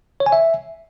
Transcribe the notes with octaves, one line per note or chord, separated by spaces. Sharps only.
C#5
G#5
E5